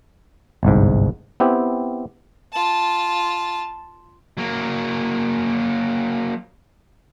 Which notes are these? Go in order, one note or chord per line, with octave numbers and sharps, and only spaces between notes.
G1 C2 G#2
B3 C4 E4 G4
F4 A5
F#3 A#3